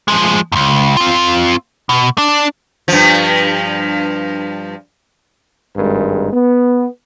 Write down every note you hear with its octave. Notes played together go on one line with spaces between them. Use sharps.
F3 G#3
C#2 F#2
C4 F4
B2
D4
G2 F3
G#1 G2 G#3 A#4
B3